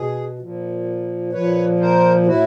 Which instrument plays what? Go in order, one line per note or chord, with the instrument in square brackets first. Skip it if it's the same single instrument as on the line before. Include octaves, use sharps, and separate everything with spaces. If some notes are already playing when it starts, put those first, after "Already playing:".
Already playing: [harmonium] B2 G#4
A#2 F3
A#2 F3 B4 C#5
A#4 C5
A2 E4 F#4